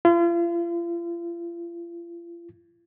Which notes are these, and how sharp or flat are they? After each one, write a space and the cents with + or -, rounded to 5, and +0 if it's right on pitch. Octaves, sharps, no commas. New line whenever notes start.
F4 -40